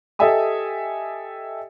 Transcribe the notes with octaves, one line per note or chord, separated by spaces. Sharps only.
G4 A4 D#5 E5 G#5 D#6